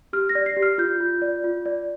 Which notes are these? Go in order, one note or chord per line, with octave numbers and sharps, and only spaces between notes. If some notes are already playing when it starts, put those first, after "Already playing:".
G4 F6
A#6
D5
C7
G4
F6
F4 G6
F4
D5
F4
D5